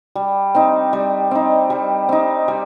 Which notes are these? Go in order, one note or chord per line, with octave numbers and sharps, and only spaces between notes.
G3
C4 D#4
G3
C4 D#4
G3
C4 D#4
G3